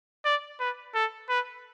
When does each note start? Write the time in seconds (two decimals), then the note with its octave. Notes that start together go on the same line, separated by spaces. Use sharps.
0.25 D5
0.60 B4
0.95 A4
1.29 B4